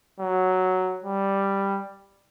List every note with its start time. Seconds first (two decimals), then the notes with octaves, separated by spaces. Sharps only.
0.20 F#3
1.04 G3